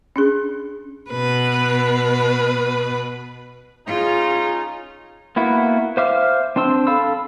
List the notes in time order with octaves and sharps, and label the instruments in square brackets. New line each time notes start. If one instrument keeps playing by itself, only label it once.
[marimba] C#4 D4 G#4
[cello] B2 B4
[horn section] C#4 D#4 [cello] F4 G#4
[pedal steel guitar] A#3 B3 E4 F#4
C5 E5 F5 D6 F6
C4 D4 C5 C6 E6
A4 F5 B5 E6